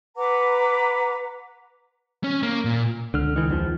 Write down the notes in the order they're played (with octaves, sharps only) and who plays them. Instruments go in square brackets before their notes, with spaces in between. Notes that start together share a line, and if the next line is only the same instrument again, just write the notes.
[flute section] B4 F#5 A#5 D6
[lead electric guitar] C#4
A#3
A#2
[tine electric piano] C#2 F6 [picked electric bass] D3
[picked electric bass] D#3 E3
E2 D#3 F3